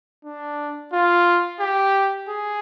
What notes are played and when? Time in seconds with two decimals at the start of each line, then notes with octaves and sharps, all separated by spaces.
0.25 D4
0.93 F4
1.60 G4
2.28 G#4